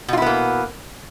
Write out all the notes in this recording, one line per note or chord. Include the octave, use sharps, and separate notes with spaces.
B2 A#3 B3 E4 F4